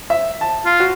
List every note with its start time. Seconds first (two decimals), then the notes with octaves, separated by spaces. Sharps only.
0.10 E5
0.41 A5
0.65 F4
0.80 F#4